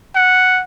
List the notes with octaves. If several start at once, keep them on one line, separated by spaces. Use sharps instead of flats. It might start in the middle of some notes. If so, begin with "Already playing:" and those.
F#5